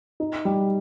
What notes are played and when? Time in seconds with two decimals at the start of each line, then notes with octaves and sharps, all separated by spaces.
0.20 D#4
0.45 G3